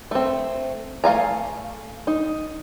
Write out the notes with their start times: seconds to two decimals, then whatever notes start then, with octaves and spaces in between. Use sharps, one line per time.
0.11 A3 C4
1.04 A3 F5 G#5 A#5
2.07 D#4